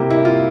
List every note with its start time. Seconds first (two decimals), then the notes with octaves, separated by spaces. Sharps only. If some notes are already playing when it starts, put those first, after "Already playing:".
Already playing: C3 G3 A#3 E4 G4
0.10 E4
0.25 F4